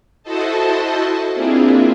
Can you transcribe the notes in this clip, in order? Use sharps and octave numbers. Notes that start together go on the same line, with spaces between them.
E4 F#4 A4 C5 D#5 A5
A#3 C4 D4 E4 F4 G#4